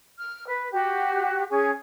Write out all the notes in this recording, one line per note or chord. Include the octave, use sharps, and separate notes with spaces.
F6
B4
F#4 G4
C#4 G#4